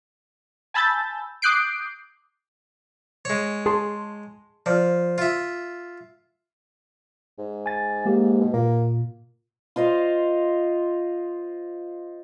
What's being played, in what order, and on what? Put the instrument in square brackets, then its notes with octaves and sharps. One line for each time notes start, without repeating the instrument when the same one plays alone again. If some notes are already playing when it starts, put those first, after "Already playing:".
[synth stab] G#5 A5 B5 E6 G6 A6
D6 D#6 F#6 G6 C7 D7
[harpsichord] G#3 C#5
[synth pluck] G#4 A5 C6
[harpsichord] F3 [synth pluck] D5 F6
[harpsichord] F4 E5
[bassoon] G#2
[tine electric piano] G#5 A6
G#3 A#3 G4
[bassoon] B2
[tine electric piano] A#2 [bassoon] A#3
[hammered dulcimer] F4 C5 D#5 F5